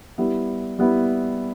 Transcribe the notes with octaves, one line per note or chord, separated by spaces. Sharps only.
G3 B3 E4
G3 B3 E4